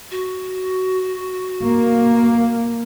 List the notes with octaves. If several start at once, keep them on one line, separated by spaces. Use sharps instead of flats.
F#4
A#3